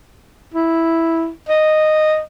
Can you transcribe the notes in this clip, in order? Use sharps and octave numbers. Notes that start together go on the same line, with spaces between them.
E4
D#5